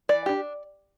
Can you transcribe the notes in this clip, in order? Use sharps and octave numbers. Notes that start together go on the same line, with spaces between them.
E3 D5
D4 G4